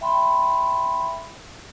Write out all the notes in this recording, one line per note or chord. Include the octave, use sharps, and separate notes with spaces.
E5 G5 B5 C6